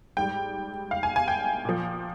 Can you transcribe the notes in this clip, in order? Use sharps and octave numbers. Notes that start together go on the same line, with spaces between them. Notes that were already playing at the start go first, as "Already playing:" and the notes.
G#2 G3 G5
F5
G#5
G#5
G5
A#2 F3